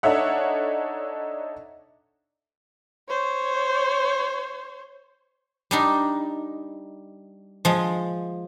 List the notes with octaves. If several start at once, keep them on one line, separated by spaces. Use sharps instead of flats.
D4 D#4 A4 C#5 E5 F#5
C5 C#5
G3 D4 D#4
F3 G#3